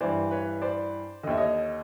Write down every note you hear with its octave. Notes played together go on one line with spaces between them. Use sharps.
G2 E3 C5 D5
B4 C#5
C5 D5
D#2 D3 D#5 E5
C#5 D#5